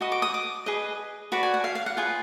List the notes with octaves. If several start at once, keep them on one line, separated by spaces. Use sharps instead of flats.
F#4 B4 D#5 D#6
D6
D#6
D6
G#4 B4 D#5
F#4 B4 D5 B5
G#5
F#5
F5
F5
F#5
F4 G#4 B4 G#5